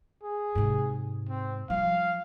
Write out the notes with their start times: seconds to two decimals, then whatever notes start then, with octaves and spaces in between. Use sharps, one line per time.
0.23 G#4
0.55 G#2 C3
1.29 C4
1.70 F3 G3 F5